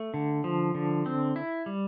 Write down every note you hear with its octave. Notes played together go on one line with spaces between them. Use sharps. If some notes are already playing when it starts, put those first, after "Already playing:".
Already playing: A3
D3
F3
D3
C4
E4
G3